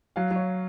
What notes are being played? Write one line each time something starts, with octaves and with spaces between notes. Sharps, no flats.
F#3 F5
F#3 C#5